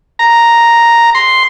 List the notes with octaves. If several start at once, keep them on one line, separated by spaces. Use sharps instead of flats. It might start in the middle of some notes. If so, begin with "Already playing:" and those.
A#5
C6